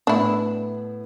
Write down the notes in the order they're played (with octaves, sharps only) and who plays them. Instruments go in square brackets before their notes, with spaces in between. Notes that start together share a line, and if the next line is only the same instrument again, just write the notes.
[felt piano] A2 B3 [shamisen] D4 E4